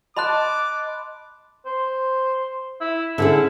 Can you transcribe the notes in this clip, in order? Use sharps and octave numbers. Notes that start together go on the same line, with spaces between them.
D#5 A5 B5 C6 D6 F#6
C5
E4
D3 C#4 E4 G#4